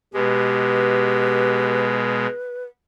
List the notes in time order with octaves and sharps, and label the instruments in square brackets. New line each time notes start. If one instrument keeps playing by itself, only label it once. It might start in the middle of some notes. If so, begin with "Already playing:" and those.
[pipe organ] B2 G#3 [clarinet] G4 [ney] B4